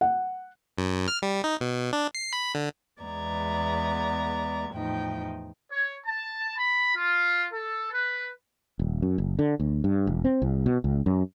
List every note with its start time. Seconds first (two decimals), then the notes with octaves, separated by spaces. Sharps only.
0.01 F#5
0.78 F#2
1.08 F6
1.22 G3
1.44 D#4
1.61 B2
1.93 D4
2.15 C7
2.33 B5
2.55 D3
2.99 E2 G#3 B3 D5 A#5 G#6
4.70 E2 A2 F3 D#4 G5
5.72 C#5
6.06 A5
6.57 B5
6.96 F4
7.52 A4
7.92 B4
8.79 D#1
9.02 F#2
9.18 F#1
9.39 D3
9.60 D2
9.84 G2
10.07 E1
10.25 C4
10.42 C2
10.66 B2
10.84 C#2
11.06 F#2